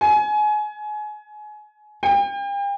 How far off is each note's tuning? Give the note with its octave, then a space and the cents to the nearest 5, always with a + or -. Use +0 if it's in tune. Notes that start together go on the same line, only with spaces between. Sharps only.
G#5 +25
G5 +40